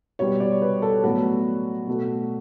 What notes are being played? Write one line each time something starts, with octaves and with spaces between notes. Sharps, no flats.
B2 G3 B3 C#5
D5
B4
A4
A2 F#3 B3 F#4
B2 A3